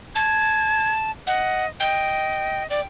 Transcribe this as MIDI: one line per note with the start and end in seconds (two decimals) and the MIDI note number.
0.15 1.11 81
0.15 0.92 92
1.27 1.68 75
1.27 1.65 78
1.80 2.69 75
1.80 2.63 79
2.70 2.81 74
2.70 2.86 79